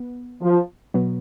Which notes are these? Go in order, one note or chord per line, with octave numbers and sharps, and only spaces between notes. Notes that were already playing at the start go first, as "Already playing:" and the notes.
Already playing: B3
F3
B2 F#3 B3